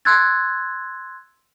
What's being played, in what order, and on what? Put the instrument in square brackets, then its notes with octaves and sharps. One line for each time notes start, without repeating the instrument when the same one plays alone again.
[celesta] C6 E6 F#6 G#6 A6